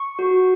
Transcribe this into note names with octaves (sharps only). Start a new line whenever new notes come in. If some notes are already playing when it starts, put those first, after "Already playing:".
Already playing: C#6
F#4